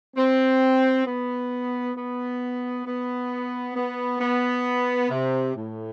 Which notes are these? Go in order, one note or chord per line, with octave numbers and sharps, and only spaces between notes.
C4
B3
B3
B3
B3
B3
C3
A2